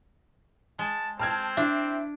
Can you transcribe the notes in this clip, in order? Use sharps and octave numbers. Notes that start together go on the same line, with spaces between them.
G#3 A5
C4 A5 F6 G#6
D4 E4